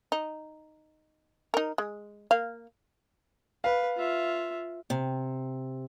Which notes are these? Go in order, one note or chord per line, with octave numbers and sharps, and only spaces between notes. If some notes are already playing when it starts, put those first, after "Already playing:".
D#4
D#4 A#4
G#3
A#3 F5
B4 F5
F4 E5
C3